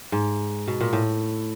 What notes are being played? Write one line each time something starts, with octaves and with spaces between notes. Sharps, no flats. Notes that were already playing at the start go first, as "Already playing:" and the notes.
G#2
B2
A#2
A2